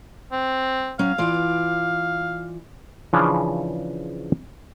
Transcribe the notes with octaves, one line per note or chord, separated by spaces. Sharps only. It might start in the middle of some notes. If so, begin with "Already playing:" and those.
C4
F#3 C#4 F5
E3 F4 D5
C#3 E3 F3 C#4 D4 G#4